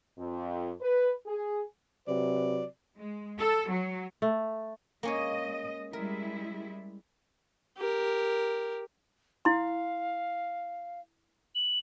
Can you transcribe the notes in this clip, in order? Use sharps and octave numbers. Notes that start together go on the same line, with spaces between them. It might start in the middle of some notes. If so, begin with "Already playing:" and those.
F2
B4
G#4
C3 F#3 B4 D5
G#3
A4
F#3
A3
G#3 A#3 C#4 C#5 D#5
G3 G#3 E4 A#4
G4 A#4
E4 F5 C6
F#7